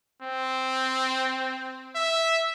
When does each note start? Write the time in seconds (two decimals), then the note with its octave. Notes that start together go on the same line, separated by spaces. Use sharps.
0.22 C4
1.95 E5